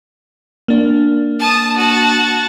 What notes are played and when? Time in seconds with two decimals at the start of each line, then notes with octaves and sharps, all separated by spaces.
0.68 A#3 D4
1.39 A5 D#6
1.77 F#4 A5